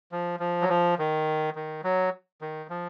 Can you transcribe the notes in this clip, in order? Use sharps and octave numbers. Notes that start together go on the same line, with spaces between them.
F3
F3
F#3
F3
D#3
D#3
F#3
D#3
F3